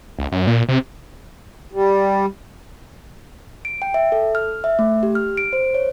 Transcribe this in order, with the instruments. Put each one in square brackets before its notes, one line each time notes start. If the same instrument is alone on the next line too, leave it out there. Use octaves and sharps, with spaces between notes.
[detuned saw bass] C#2
F#2
A#2
C3
[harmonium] G3
[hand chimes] D7
G5
E5
A4
F6
E5
A3
G4
F6
D7
C5
C#5